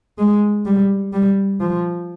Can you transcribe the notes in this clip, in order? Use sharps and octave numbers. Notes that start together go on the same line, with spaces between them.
G#3
G3
G3
F3